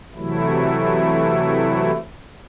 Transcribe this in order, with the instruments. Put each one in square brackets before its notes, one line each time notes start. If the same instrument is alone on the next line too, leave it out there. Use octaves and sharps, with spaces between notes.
[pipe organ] C3 E3 F#3 A3 E4